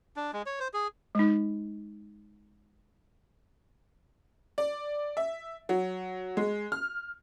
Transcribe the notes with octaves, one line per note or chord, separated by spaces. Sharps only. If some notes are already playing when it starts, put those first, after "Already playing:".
D4
G#3
C#5
C5
G#4
G#3 D#4
D5
E5
F#3
G#3
F6